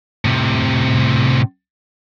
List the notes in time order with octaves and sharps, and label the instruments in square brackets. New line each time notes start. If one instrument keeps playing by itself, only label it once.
[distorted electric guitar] A2 C3